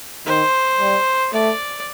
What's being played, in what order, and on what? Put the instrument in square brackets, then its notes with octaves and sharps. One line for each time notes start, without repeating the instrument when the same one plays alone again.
[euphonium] D#3 [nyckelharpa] C5
[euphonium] G3
[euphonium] A3 [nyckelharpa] D5